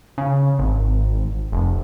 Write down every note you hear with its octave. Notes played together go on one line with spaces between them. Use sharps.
C#3
G#1
F1